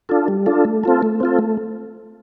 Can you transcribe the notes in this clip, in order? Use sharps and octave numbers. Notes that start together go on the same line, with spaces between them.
D4 F4 A4
G3
D4 F4 A4
A3
C4 F4 A4
A3
C4 F4 A4
A3